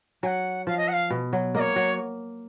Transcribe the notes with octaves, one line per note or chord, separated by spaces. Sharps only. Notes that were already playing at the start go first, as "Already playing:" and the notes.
F#3 F#5 G#5
F3 F5
D#5
F#5
F5
B2
F#3
A#3 C#5 D#5
F#3